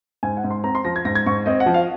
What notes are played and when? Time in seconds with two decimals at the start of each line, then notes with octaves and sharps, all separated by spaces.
0.23 G#2 G#5
0.37 F#5
0.44 G#2
0.51 C6
0.64 C4 A#5
0.75 C6
0.85 F3 A#6
0.96 G#6
1.05 G#2 A#6
1.15 G#6
1.26 G#2 C#6
1.46 C4 D#5
1.60 F#5
1.66 F3
1.74 F5